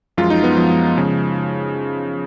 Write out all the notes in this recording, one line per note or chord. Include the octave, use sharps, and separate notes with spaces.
F#2 F3 G#3 F4
D#4
B3
F#2 F3 G#3
C#3 F3 G#3